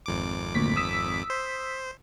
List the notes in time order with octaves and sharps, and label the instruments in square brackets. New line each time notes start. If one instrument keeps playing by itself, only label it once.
[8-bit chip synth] G#1 F2 D6
[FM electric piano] D2 A#2 B6
D#6 E6 B6
[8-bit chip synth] C5